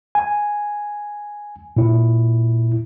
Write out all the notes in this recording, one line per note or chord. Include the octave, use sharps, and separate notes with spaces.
G#5
A#2 E4